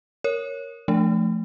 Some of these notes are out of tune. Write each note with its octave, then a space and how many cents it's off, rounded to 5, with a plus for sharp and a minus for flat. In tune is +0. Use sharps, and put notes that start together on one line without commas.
A#4 +0 C#5 +0
F3 -10 A3 -10 D4 +0